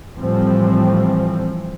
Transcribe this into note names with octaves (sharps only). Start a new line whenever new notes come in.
A2 E3 F3 G3 C4